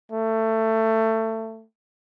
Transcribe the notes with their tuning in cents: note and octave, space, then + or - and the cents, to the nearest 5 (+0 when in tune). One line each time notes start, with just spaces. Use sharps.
A3 +20